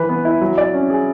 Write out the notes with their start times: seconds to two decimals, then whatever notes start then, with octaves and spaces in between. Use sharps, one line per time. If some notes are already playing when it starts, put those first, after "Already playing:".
Already playing: E3 B4
0.09 B3
0.25 E4
0.41 F#3
0.58 D5
0.74 C#4
0.90 G#4